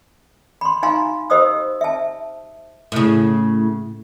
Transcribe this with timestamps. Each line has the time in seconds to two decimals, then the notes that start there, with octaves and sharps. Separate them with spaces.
0.61 B5 C6
0.83 D#4 F#4 F5 G#5 A#5 C6
1.30 G4 C5 D#5 D#6 E6
1.81 E5 A5
2.92 A2 C#3